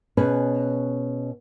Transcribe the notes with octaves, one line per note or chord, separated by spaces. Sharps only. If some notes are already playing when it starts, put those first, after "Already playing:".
B2 C#4 G#4 B4